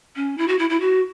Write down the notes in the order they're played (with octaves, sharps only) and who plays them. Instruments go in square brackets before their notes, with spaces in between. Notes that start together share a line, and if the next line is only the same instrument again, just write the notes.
[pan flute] C#4
E4
F#4
E4
E4
F#4